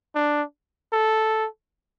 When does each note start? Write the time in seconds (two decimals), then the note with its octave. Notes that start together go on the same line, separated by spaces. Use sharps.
0.15 D4
0.93 A4